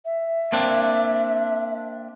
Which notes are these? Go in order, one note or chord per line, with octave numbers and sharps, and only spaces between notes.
E5
A#3 C4 D4